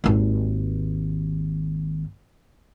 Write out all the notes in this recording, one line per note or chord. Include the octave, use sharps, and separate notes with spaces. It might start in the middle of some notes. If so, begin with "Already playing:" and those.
G#1 D#2